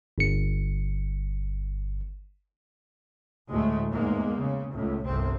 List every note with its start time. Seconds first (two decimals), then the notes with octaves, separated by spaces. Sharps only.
0.18 G1 C#7
3.49 D2 A2 G#3 A3
3.90 E2 G#2 G#3 A#3
4.37 C#3
4.72 C#2 A2
5.05 G1 C2 C4